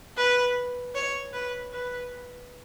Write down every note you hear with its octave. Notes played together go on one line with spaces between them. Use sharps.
B4
C#5
B4
B4